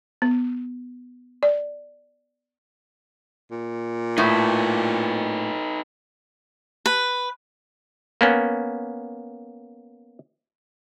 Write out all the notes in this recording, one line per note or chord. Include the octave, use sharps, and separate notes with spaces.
B3
D5
A#2
A2 D#4 B4
B4
A#3 B3 C#4